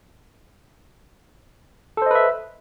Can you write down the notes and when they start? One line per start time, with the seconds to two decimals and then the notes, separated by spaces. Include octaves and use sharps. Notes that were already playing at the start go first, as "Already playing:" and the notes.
1.97 A4
2.02 C5
2.06 D#5
2.11 B4
2.15 E5